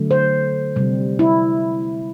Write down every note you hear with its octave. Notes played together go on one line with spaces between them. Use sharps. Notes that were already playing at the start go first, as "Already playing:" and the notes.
Already playing: D3 F#3 A3
C5
C3 G3
E4